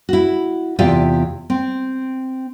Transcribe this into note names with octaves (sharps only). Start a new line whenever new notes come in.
E4 F#4
E2 C3 F4 G4 D5 E5
C4